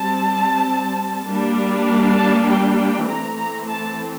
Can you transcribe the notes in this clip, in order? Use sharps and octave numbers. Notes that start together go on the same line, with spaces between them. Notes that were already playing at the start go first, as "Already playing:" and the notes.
Already playing: G3 C4 A5
G3 A#3 D4
A5
G5
G5
E3 A3 C4 A#5
A#5
A5